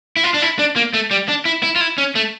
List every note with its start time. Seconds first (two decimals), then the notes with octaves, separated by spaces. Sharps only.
0.16 E4
0.24 F4
0.34 D4
0.42 E4
0.59 D4
0.76 A#3
0.94 A3
1.11 G3
1.28 D4
1.45 E4
1.63 E4
1.76 F4
1.81 E4
1.98 C#4
2.15 A3